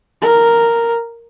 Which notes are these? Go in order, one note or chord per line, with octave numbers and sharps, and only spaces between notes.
A#4